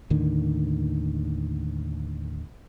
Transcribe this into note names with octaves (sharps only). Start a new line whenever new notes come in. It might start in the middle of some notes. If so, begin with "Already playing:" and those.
D#2 A2 D3 D#3